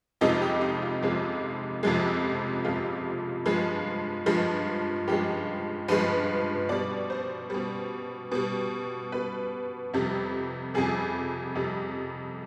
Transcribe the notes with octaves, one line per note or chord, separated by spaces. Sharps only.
F2 C3 F3 G#3 D#4
G4
D#4
F4
F2 C3 F3 G#3
F2 C3 F3 G#3
F2 C3 F3 G#3 F4
G2 F3 G#3
G2 F3 G#3
G2 F3 G#3 G4
G2 F3 G#3 B4
B2 G3 D5
C5
B2 G3
B2 G3
B2 G3 B4
F2 C3 G3
F2 C3 G3 G#4
F2 C3 G3